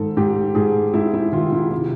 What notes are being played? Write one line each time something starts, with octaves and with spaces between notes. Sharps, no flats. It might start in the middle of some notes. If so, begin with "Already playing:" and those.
Already playing: G#2 D#3 A4
G#2 G4
G#2 G#4
G#2 E4
E4
D#3 F4
E4
C3